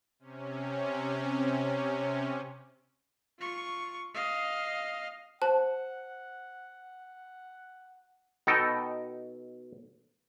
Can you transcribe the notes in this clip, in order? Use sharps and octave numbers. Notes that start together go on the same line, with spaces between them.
C3 C#4
F4 C#6
D#5 F5
C5 F#5 A5
B2 D#4 A4 G5